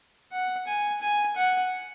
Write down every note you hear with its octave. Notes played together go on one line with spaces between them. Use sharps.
F#5
G#5
G#5
F#5